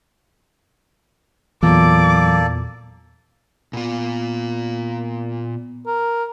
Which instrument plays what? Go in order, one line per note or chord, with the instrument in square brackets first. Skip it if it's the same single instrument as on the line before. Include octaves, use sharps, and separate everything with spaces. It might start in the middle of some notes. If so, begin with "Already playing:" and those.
[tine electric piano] E2 A#2 [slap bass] E3 F#3 [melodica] A#3 A4 D5 [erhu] D6
[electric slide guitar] A#2 F4 [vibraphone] B3
[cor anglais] A#4